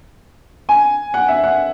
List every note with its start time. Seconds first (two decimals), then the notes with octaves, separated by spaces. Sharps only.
0.69 G#5
1.14 F#5
1.28 E5
1.44 F#5